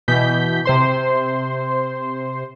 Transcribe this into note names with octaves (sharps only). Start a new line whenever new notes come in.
B2 E3 G6 B6
C3 C5 C6